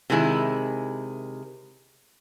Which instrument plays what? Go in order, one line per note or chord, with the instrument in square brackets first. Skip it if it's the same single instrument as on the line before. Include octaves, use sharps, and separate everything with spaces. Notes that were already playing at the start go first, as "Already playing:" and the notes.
[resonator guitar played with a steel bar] C3 D#3 G#3 E4